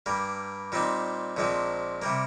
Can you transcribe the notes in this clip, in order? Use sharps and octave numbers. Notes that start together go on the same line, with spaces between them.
G2 G3 A#3
A#2 G3 C4 D#4
A#1 A#2 G#3 C4
C3 G3 A#3